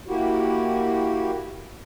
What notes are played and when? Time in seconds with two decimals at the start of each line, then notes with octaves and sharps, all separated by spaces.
0.07 A#3 E4 F#4 G4